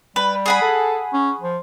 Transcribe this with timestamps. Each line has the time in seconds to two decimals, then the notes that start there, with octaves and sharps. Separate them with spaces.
0.16 G3 B4
0.46 G#4 F#5 B5
0.62 A4
1.13 C#4
1.40 F3